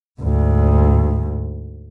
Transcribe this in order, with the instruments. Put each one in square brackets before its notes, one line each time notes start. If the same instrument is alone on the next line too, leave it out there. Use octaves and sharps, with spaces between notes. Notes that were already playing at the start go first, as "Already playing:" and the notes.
[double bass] D2 G#2